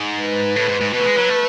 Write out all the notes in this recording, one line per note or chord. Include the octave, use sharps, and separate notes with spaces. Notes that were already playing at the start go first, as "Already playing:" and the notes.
Already playing: G#2
B4
A2
G#2
G#2
B2 B4
A3
G#3
F#3
A3